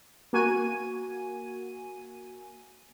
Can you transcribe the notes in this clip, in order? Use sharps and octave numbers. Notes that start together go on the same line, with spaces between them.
A#3 F#4 G#5 D#7